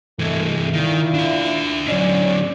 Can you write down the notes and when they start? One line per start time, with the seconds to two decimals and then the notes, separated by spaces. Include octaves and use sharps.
0.19 C2 E3 G#3 A3
0.74 A#2 D#3 E4
1.14 D4 E5
1.88 D3 F#3 C#4 D5